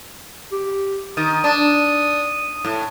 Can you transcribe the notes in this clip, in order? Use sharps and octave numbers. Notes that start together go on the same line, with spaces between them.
G4
D#3 D#6
D4
A2